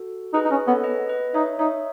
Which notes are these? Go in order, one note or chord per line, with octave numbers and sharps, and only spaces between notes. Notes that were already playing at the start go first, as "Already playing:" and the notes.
Already playing: F#4 A4
D#4 G#4 B4
D#4
C#4 G#4 B4
B3 A4 C#5
B4 D#5
B4 D#5
D#4 C#5 E5
D#4 C#5 E5